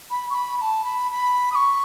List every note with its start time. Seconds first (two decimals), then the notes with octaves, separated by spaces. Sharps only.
0.10 B5
0.29 C#6
0.34 B5
0.57 B5
0.61 A5
0.84 B5
1.11 B5
1.51 D#6
1.55 C#6